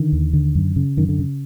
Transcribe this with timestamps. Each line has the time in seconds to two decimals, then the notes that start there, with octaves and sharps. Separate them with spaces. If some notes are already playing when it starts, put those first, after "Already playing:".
Already playing: D3 D#3
0.12 D#2
0.33 D3
0.55 F#2
0.76 C#3
0.97 F#2 D#3
1.09 D3
1.19 C#3